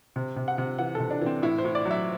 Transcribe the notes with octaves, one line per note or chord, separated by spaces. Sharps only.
C3
C3
F#5
C3
E3 F#5
C3 A4
D4
E3 C4
A2 E4
C5
A2
D5
F#3
E5